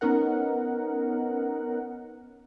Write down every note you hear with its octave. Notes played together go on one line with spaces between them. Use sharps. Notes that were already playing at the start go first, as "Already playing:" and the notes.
B3 C#4 D#4 A#4 F#5